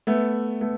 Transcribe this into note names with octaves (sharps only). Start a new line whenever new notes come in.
A3 B3
A3 B3